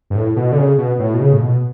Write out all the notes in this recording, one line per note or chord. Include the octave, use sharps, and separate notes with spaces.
G2
A2
B2
D3
C#3
B2
A2
B2
C#3
A2
B2